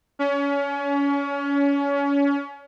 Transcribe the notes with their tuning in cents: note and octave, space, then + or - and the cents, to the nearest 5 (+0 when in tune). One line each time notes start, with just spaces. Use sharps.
C#4 +30